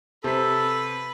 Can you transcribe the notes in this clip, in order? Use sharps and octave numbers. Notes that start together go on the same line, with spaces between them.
C3 A4 B4 B6